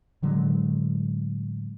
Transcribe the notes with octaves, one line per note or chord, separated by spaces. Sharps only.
A2 D3 F#3 G#3